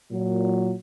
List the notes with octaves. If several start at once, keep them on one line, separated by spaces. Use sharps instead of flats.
A#2 F#3